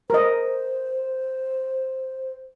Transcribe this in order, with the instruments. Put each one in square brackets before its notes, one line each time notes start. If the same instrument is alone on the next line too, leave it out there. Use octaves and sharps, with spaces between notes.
[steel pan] A#4 D#5 [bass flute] C5